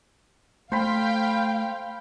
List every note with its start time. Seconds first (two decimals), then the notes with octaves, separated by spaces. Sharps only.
0.72 A3 C5 F5 G5 B5